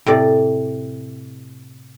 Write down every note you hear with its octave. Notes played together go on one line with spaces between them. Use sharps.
A2 C3 D5